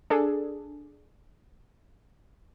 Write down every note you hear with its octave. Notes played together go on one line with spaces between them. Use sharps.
D4 G#4 A4